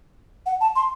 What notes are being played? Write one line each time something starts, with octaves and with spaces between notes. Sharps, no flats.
F#5
A5
C6